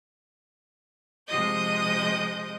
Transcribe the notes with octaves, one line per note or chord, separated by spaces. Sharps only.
C3 F3 G#3 D#5 D#6 G6